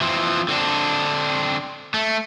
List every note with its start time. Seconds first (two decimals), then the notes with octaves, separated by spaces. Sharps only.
0.01 E3 F3 C4
0.48 D3 C4 D4
1.94 A3